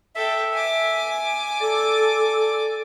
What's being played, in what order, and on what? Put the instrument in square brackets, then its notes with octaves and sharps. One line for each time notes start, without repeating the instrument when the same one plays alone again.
[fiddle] A4 G5 [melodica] E5
[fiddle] G#5 D6
[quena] A4 [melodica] D5